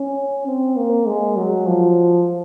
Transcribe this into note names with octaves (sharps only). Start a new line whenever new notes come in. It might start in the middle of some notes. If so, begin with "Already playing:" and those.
Already playing: C#4
C4
A#3
G#3
F#3
F3